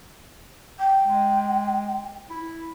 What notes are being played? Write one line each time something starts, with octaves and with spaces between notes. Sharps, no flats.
G5
G#3
E4